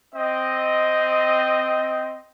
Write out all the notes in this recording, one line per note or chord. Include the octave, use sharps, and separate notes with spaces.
C4 D#5